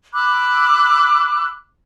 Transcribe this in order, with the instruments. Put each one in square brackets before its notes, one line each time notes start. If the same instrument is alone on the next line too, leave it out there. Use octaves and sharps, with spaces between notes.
[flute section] B5 D6 E6 F#6